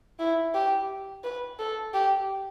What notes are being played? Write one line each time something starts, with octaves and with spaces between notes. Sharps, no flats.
E4
G4
B4
A4
G4